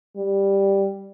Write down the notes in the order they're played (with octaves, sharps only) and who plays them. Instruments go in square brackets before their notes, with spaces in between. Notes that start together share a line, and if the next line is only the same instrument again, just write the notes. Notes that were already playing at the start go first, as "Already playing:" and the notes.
[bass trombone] G3